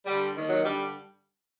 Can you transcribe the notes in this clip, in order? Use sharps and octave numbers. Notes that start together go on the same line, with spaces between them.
G2 D3 G3
D#2 D#3
F#3
G2 D3 G3